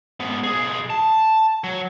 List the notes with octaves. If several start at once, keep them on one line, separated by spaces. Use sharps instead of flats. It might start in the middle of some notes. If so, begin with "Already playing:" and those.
G#2 B3
B1 G#4
A5
F#3